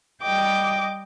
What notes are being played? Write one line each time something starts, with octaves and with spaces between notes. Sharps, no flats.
G3 D#5 G5 D6